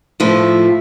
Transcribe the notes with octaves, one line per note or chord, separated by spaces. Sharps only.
A2 F3 A3 E4 F4